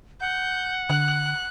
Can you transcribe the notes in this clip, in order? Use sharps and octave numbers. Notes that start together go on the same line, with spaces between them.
F#5 G6
D3 F#6